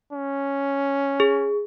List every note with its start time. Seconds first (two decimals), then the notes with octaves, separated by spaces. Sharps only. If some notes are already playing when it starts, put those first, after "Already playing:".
0.13 C#4
1.20 G#4